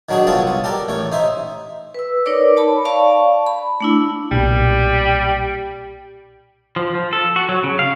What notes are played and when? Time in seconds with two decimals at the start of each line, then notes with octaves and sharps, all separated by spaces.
0.09 D#3 F#3 D4 F#4 G#4
0.27 C2 B3 F4 A4 C#5 A5
0.47 B3
0.64 G4 A4 A#4 D5
0.88 A1 A2 C#5
1.12 D#4 C5 E5
1.94 B4 E6
2.26 D#4 A#4 B4 C#5 D5 D6
2.56 C#5 A5 B5
2.85 D5 F5 A5 C#6
3.47 B5
3.80 A3 D4 E4
4.31 B1 A#2 G3
6.76 F3
6.95 F3
7.13 A4
7.36 F#4
7.49 F#3
7.64 C#3
7.79 F5